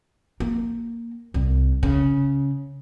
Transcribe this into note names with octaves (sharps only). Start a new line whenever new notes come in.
A#3
C2
C#3